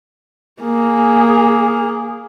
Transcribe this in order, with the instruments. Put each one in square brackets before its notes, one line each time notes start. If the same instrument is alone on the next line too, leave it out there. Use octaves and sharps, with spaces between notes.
[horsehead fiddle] A#3 G#4